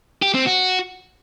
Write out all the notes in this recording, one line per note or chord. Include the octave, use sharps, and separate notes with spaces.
G4
C4
F#4